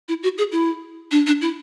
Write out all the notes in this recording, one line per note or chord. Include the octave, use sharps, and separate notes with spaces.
E4
F#4
G#4
E4
D4
D4
E4